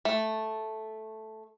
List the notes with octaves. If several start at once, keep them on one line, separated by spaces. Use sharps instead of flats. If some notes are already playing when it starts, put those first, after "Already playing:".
A3